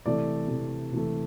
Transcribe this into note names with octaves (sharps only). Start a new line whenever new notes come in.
C3 E3 A3 D5
C3 E3 A3
C3 E3 A3